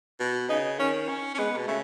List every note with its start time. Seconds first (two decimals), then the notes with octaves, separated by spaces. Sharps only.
0.20 B2
0.49 C#3 D#4
0.79 D#3 C#4
1.09 C#4
1.34 C#4
1.38 G#3 B3
1.58 B2
1.67 C#3 A3